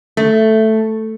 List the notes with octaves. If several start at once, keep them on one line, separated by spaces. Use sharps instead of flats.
A3